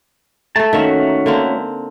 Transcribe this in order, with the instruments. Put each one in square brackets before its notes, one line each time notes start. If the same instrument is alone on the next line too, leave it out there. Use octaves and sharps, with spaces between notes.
[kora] A3 A4 [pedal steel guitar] A5
[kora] D#3 A#3 E5 [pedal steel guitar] A3 C#4 F#4
[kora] D3 A#3 C4